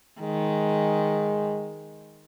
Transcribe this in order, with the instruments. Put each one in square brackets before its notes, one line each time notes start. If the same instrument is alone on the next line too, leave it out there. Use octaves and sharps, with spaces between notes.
[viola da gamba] D#3 [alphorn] G#3